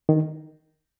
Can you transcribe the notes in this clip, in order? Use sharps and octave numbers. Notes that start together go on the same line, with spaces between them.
D#3